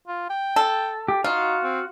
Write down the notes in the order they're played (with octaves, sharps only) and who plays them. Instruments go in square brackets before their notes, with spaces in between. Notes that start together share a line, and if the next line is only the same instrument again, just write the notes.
[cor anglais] F4
G5
[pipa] A4
[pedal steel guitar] G4
[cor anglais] D#4 [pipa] F4 [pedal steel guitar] F#4 F5
[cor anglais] C4